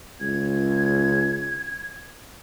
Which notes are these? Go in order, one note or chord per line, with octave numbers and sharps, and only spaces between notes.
C#2 G#6